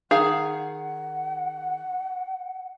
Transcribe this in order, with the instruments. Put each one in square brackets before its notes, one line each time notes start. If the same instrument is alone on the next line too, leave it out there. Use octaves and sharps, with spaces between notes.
[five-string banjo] D#3 G#4 F5 [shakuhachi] F#5